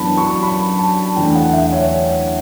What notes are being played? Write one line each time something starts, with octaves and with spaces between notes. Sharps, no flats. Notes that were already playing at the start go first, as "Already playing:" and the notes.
Already playing: F#2 E3 B3 D4 A5 B5
C#6
B5
A5
E2 D3 A3 D4 G5
F#5
E5
C#5